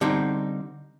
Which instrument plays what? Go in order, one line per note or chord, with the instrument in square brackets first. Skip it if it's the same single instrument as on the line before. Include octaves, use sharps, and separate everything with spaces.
[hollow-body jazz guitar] D3 G3 C4 D#4